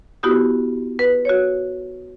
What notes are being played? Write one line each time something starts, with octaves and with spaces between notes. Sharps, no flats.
B3 E4 F#4 G4 D#6
B4
F#4 C#5